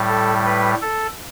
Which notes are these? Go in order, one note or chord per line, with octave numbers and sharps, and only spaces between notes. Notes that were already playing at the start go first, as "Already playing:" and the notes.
Already playing: A2 G3
A4
B4
A4